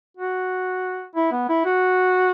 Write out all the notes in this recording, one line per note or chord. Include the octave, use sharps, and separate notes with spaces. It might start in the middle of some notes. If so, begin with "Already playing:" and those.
F#4
E4
B3
E4
F#4